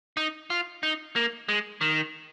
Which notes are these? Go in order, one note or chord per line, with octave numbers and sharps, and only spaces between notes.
D#4
F4
D#4
A#3
G#3
D#3